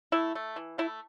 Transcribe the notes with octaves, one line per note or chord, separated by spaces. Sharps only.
A3 E4
A3
E3
A3 E4